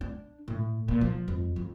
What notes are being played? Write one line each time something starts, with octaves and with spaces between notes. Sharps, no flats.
D4
A2
A#2
F3
F2
F2